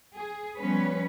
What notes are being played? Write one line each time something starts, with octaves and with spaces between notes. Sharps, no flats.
G#4
F3 G3 B3 C#4 B4 C#5